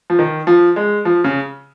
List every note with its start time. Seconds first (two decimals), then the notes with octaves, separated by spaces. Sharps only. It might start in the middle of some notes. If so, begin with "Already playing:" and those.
0.10 F3
0.19 D#3
0.47 F3
0.76 G#3
1.05 F3
1.24 C#3